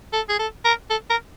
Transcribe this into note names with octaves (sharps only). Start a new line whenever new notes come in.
A4
G#4
A4
A#4
A4
A#4